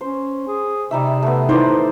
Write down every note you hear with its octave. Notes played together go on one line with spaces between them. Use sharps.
C#4 C5
G#4
C3 G3 D#4 E5
A3 B3
D#4 E4 B4 C5 D5